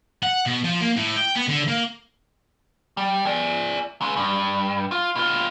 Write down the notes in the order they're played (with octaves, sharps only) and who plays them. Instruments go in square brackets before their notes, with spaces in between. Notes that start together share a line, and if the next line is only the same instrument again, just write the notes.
[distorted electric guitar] F#5
B2
F3
A#3
A2
G5
B3
D3
A#3
[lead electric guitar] G3
G#4 D5
C#3 G#3
G2
F4
B2 F4